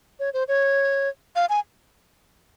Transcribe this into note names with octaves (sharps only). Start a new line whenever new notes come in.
C#5
C5
C#5
F5
G#5